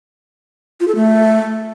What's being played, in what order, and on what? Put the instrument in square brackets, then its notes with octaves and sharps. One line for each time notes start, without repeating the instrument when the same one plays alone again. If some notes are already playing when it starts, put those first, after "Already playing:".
[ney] F4
A4
A3